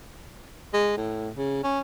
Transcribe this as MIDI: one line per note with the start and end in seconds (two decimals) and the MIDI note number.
0.74 0.93 56
0.97 1.30 45
1.37 1.63 49
1.64 1.80 61